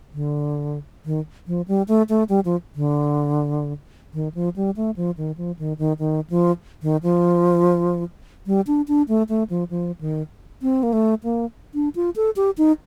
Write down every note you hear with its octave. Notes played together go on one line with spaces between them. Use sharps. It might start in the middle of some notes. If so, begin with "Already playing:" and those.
D3
D#3
F3
G3
A3
A3
G3
F3
D3
D#3
F3
G3
A3
F3
D#3
F3
D#3
D#3
D#3
F3
D#3
F3
G3
D4
D4
A3
A3
F3
F3
D#3
C4
A#3
A3
A#3
D4
F4
A4
G4
D#4